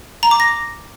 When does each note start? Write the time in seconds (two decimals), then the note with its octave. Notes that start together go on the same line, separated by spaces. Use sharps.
0.23 A#5
0.31 D6
0.40 A#6